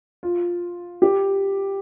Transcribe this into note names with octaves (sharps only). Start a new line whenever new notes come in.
F4
G4